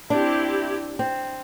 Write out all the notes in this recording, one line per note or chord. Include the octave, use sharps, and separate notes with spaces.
C4 D4 E4 G4
C4